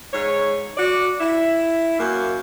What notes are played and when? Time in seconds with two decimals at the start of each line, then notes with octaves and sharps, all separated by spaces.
0.13 G#2 C#5
0.77 F#4 D5
1.20 E4
1.99 F#2 A#3